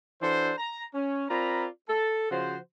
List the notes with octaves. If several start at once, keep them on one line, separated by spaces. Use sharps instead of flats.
E3 D4 F#4 A4 C5
A#5
C#4
C4 F4 A#4 D5 A#5 B5
A4
C#3 F3 F#4 C5